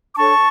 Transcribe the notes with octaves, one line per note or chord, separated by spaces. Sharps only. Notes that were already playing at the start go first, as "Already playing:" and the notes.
D6
D4 A4 C#5 A5 C#6